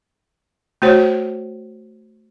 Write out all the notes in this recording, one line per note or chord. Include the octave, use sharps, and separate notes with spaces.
A3 F#4 C5 C#5